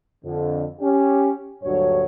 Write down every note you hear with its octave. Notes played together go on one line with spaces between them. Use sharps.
F2 D3
C#4 G4
D2 G2 A#2 F#3 C#5